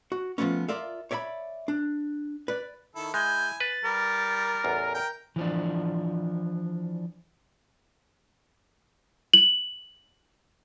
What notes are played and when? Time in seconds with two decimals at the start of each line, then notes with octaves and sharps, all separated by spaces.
0.12 F#4
0.38 F3 G#3 A3 B3 C#4
0.68 F4 A#4 D5 E5 F5
1.11 C#5 D5 E5 G#5 B5
1.68 D4
2.48 B4 D5
2.95 D#3 E4 A4
3.14 G#3 E4 G#5 G6
3.60 B4 A6
3.84 G3 A#4
4.64 A1 E2
4.95 A#4 G5
5.36 E3 F3 D4
9.34 F#7